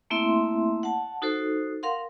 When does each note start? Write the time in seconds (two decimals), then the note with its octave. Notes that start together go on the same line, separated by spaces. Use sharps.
0.10 A3 A#3 C4 E4 E5 C6
0.83 F#5 A5
1.22 D#4 F#4 A4 C5
1.83 A#4 F5 F#5 C6